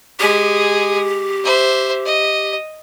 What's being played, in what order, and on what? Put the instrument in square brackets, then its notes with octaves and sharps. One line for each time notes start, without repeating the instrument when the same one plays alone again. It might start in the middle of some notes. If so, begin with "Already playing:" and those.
[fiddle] G#3 G#4 [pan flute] G4
[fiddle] C5 E5
D#5